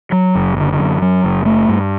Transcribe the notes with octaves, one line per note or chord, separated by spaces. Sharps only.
F#3
F#1
D3
F#2
F#3
F#1
A3
G2